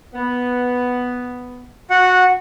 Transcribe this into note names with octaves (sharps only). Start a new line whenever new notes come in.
B3
F#4 F#5